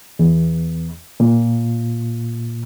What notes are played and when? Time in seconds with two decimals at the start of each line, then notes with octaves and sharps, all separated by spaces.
0.19 E2
1.20 A#2